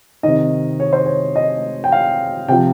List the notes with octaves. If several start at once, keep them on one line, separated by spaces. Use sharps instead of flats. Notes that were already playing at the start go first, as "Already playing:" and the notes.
C3 D#3 D#5
C#5
C5
C#5
D#5
G5
F5
C3 F3 G5